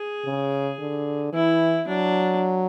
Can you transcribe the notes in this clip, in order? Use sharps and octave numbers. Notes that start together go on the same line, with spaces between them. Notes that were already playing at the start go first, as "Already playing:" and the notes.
Already playing: G#4
C#3
D3
E3 E4
F#3 D4